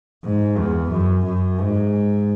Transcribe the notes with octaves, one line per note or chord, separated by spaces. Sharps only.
G#2
E2
F#2
F#2
G#2